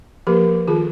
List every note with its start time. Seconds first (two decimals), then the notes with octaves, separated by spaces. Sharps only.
0.27 F3 A#3 G4 A#4
0.68 D#3 F4 G#4